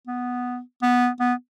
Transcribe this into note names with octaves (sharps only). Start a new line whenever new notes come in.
B3
B3
B3